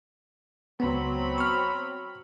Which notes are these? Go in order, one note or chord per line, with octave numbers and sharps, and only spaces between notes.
C#2 F#3 B3 C4 B5
C#6 F6